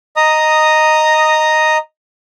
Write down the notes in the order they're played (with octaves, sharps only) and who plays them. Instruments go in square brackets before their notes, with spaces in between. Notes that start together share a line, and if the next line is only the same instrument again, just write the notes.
[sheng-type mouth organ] D#5 A#5 D#6